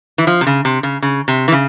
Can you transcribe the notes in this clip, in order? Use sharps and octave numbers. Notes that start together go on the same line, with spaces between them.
E3
F3
C3
C#3
C3
C#3
C#3
C3
E3
C#3